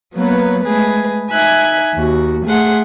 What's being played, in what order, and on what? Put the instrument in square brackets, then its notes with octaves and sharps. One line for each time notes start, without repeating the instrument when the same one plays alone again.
[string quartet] F#3 A#3 B3 B4 C#5
G#3 A3 G#4 B4
D#4 E5 G#5 F#6 G#6
D#2 F#4
A3 G#4 F#5 C6